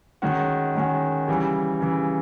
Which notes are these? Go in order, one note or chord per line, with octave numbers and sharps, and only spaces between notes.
D#3 G#3 C#4 F#4
D#3 G#3 C#4 F#4
C#3 E3 G3
C#3 E3 G3